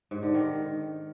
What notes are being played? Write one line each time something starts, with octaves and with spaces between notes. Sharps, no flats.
G#2
D3
D#3